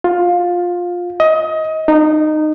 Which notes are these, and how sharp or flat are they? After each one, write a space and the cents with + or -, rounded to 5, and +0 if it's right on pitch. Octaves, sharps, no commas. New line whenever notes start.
F4 +15
D#5 +25
D#4 -20